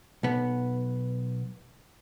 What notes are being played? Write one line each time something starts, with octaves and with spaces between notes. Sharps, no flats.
B1 B3